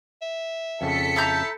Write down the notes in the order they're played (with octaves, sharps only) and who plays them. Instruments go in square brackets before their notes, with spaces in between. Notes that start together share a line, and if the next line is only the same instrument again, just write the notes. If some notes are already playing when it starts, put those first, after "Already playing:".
[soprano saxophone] E5
[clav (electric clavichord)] F2 C#3 [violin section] A4 B6 C#7
[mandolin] E4 A#5 G6 [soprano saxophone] A5